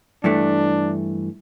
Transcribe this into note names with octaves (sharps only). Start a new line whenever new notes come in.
G2 E3 A3 D4